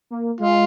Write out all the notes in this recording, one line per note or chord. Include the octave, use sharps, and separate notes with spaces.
A#3
G#3 F4